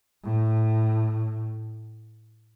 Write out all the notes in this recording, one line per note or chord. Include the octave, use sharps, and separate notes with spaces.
A2